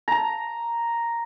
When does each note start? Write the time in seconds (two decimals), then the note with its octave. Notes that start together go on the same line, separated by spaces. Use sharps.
0.08 A#5